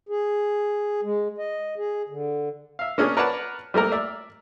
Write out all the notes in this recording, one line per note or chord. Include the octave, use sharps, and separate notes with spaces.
G#4
G#3
D#5
G#4
D3
E5 F5
A#3 C#4 D4 G#4 C#5
A#4 B4 C#5 D5 F#5 A5
G3 A3 A#3 A#4
D5 E5